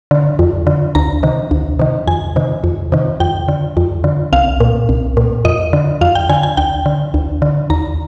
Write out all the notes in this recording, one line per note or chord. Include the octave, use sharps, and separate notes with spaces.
D3
F2
D3
D2 A#5
C3 D#3
D2
C3 D#3
F2 G#5
C3 D#3
F2
C3 D#3
F2 G5
D3
F2
D3
C2 F5
A#2
C2
A#2
F2 D#5
D3
F2 F5
G5
D3 G#5
G#5
D2 G5
D3
D2
D3
D#2 A#5